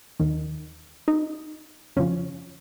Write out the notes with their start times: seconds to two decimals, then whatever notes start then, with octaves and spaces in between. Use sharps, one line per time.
0.20 D#2 D#3
1.08 D#4
1.96 F2 C#3 F3 C#4